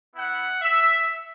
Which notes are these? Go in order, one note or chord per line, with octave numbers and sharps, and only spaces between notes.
B3 E4 F#5
E5